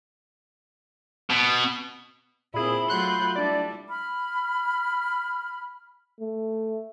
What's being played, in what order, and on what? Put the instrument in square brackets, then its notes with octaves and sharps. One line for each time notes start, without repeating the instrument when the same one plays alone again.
[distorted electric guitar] B2
[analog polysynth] A#2 G#4 [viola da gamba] C4 E4 [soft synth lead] B5
[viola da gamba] F#3 A3 F4 [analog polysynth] C6 F#6 G6
[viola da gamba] G3 E4 [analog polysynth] D4 D5
[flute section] B5 F6
[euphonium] A3